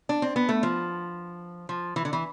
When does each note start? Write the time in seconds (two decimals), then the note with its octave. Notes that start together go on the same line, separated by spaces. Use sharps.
0.09 D4
0.22 C4
0.36 B3
0.49 A3
0.63 F3
1.69 F3
1.96 E3
2.05 D3
2.13 E3